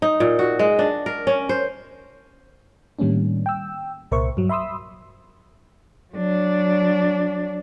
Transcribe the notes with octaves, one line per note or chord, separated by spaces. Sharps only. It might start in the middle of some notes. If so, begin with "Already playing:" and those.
D#4
A#2
F#4
G#3
D4
A#4
C#4
C5
A2 D#3 G3 A#3 C#4 D4
G5 E6
C2 A#2 A#4 C5 E5 C#6
G2 F#3
E5 B5 C6 D#6 E6
F#3 D4